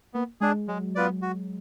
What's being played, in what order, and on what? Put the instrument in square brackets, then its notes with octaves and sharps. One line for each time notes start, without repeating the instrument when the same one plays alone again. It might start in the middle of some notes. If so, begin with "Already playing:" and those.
[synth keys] A#3 [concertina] B3
[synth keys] G#3 [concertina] D4 G#4
[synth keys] F#3 [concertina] G#3
[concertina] B3 F4 B4 D5
F#4